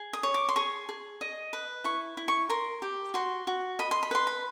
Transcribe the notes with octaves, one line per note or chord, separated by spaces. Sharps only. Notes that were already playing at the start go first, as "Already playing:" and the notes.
Already playing: G#4
D#6
C#5
D6
C6
G#4 C#6
G#4
D#5
B4
E4 C#6
E4
C#6
A#4 C6
G4
F#4 C6
F#4
D#5 B5
C6
B5
B4 C6
B5